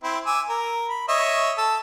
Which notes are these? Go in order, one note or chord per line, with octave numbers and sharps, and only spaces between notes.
C4 E4
G#5 D6 E6
A#4
B5
C#5 D#5 E5
A4 E6